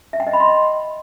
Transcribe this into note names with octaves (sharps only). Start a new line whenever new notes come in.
E5
G5
D#5
B5
C6